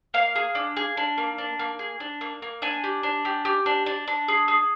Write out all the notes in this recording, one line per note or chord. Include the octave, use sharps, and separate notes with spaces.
A#3 F5
G#4
D4
G#4
D4
A#3
D4
A#3
G#4
D4
A#3
A#3
D4 G#5
G4
D4
G4
G4
D4
D4
D4
G#4
G#4